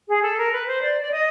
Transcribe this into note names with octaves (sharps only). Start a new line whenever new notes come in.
G#4
A4
A#4
B4
C5
D5
D5
D#5